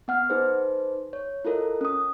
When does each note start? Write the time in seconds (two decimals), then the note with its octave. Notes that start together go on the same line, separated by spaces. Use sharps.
0.08 B3 F#5 F6
0.30 D#4 G#4 B4 C5
1.13 C#5
1.45 E4 F4 A4 A#4 D#5
1.81 C#4 D#6